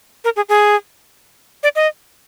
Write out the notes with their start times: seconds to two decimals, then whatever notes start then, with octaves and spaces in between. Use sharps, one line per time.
0.24 A#4
0.36 G#4
0.49 G#4
1.63 D5
1.76 D#5